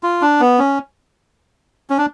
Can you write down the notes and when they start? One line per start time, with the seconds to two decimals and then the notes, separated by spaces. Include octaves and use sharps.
0.03 F4
0.22 D4
0.40 B3
0.59 C#4
1.90 C#4
1.98 D4